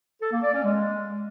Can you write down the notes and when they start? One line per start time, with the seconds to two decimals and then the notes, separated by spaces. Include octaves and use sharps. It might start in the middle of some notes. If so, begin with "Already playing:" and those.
0.21 A4
0.32 A#3
0.42 D5
0.53 C#4
0.64 G#3